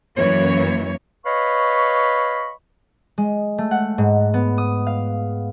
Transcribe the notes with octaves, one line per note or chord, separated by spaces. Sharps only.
F#2 E3 A#3 C#5
B4 C#5 D#5 F5 B5 C#6
G#3
A3
F#5
G#2
B3
D#6
F5